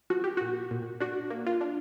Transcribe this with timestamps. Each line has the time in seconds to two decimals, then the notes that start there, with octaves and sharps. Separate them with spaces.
0.10 F3 F#4
0.24 G4
0.37 A#2 F#4
0.71 A#2
1.00 D4 F#4
1.30 A#3
1.46 F4
1.61 D4